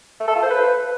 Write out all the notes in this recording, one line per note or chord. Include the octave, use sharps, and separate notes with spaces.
A3
A4
F4
C5
B4